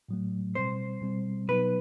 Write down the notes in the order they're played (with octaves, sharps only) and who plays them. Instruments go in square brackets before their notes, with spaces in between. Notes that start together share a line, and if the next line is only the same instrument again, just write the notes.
[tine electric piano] A2 F#3 A3
[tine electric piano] B2 G3 C4 [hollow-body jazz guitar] C5
[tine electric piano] B2 G3 C4
[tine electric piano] B2 F#3 B3 D#4 [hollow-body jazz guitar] B4